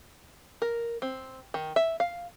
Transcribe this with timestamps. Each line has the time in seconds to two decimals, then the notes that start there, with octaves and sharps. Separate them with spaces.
0.62 A#4
1.02 C4
1.54 D#3
1.76 E5
2.00 F5